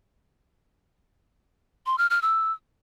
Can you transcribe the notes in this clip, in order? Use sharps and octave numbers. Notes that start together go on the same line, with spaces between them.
C6
F6
F6
E6